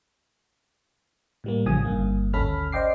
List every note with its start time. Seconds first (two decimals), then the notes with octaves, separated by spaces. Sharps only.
1.44 A2 G3 A#3
1.66 A1 C#3 F3 G#5 D#6
1.85 G1 G2 A#3
2.34 G#1 D2 C#4 A4 B5 F6
2.72 C5 D5 D#5 G5 D6 C7